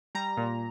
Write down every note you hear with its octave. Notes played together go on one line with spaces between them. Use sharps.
G3 A#5
A#2